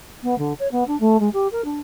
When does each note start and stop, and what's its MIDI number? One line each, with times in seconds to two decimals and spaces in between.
0.23 0.37 59
0.38 0.53 50
0.59 0.67 73
0.71 0.83 59
0.87 0.98 62
1.00 1.19 57
1.19 1.28 56
1.33 1.47 67
1.51 1.64 70
1.64 1.79 62